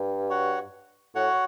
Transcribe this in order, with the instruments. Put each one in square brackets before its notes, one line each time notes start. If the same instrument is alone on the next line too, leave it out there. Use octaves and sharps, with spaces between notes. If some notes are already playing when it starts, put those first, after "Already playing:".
Already playing: [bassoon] G2
[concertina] F#4 C#5 F#5
[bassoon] A2 [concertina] F#4 C#5 F#5